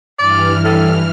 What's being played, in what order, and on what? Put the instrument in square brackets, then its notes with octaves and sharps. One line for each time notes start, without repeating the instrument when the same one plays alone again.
[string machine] G2 E3 F6 [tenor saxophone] D5
[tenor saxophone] A2